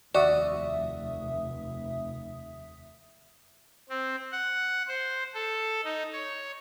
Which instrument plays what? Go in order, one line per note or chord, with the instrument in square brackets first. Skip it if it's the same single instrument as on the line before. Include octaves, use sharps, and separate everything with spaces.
[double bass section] F1 [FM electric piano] D#2 E5 D#6 [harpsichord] F#4 [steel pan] D5
[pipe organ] C4
F#5
C5
A4
D#4
C#5